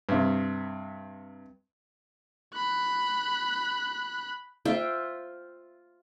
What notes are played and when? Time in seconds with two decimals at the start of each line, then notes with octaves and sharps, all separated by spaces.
0.09 G2 C3
2.54 B5 F#6
4.65 F4 C5 E5 G5